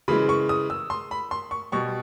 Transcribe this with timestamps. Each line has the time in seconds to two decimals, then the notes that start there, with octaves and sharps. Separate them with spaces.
0.08 C#3 E3 G#3 B5
0.29 C#6
0.49 D#6
0.70 E6
0.90 C6
1.11 B5
1.31 C6
1.51 C#6
1.72 B2 G3 C#6